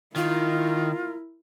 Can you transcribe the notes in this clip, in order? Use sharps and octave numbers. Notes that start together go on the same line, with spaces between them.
D#3 E4 F4 A#4